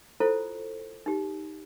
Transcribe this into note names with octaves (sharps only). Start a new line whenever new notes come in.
E4 F4 A4 C5
D#4 G4